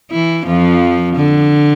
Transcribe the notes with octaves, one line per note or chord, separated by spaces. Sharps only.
E3 E4
F2 F3
D3